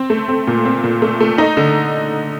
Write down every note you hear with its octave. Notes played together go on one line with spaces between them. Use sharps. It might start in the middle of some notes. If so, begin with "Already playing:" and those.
Already playing: C4
A3
C4
A#2
C4
A#2
A3
A3
D#4
D3